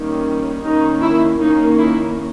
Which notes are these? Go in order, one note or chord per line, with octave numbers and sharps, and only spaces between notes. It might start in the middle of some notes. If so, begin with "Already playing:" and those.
Already playing: D#3 G3 A#3 C#4
D#3 A#3 C#4 D#4
E4
D#3 A#3 C#4 D#4
E4